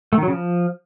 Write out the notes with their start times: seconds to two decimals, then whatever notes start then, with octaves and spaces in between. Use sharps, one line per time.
0.13 A3
0.18 D#3
0.23 F#3
0.28 C#3
0.33 F3